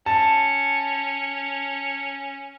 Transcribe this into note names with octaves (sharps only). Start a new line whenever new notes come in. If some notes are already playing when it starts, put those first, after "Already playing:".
C#4 A5